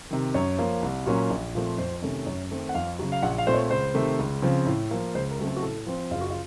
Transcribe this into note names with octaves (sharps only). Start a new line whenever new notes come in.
C3 D#3
F#2 C#5
F3 A#3
C2
A#2 F#3 A#3 C#4
A#1
A#2 F3 A3 C4
F2 C5
C3 D#3 A3 C#4
F#2 C#5
D#3 A3 C4
F#5
F2 F5
C#3 F#3
F5
A#1 F#5
F5
A#2 A3 C4 C5
C#5
C#2 C5
C3 D#3 A3
C#2
C#3 F3 C4
A2
F3 A#3
C#2 C5
A#4
C#3 F#3 A3 C4
A4
F#4
A2 A4
F3 C4
F#1 F4
F#4
F4